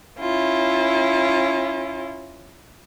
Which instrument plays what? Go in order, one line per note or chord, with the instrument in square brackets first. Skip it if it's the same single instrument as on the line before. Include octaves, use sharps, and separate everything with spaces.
[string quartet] C#4 E4 F4